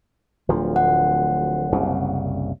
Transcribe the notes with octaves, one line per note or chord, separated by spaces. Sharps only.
D1 D2 F3
F#5
F#1 C2 C#3